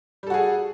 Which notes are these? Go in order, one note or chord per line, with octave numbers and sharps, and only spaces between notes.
G3 F#4 G#4 A4